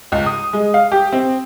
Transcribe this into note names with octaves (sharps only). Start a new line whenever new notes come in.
C#2
D#6
G#3
F5
G4
C4